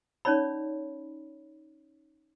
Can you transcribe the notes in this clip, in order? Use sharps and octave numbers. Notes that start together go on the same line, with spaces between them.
C#4 D#4 C#5 D5 B5